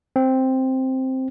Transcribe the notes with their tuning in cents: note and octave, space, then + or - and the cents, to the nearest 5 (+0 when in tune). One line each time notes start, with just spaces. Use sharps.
C4 +0